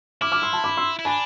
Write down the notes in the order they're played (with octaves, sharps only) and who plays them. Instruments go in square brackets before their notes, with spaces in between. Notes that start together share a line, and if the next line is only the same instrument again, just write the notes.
[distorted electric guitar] E4 [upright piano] D6 F6
[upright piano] D6 F6
C6 E6
A5 C6
B5 D6
C6 E6
[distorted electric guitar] E4
[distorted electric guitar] D4 [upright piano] G#5 B5